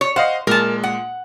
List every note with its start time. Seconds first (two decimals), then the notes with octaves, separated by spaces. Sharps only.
0.01 C#5
0.16 C5 D#5 F5 F#5
0.47 A#2 G#3 A#4 A5
0.84 F#5